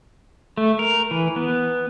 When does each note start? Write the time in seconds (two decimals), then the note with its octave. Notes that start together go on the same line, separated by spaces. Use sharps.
0.57 A3
0.79 A#4
1.11 E3
1.36 B3